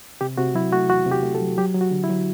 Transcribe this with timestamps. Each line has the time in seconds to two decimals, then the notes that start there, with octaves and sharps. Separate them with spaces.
0.21 C3 G4
0.38 C3 F#4
0.54 F#3 E4
0.72 A3 F#4
0.89 E2 F#4
1.06 C3
1.11 G4
1.23 A3
1.35 A4
1.41 F#3
1.58 F#3 G4
1.74 F#3
1.81 F#4
1.91 D3
2.04 E4
2.09 F#3